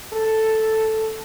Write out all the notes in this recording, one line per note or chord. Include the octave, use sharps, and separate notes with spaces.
A4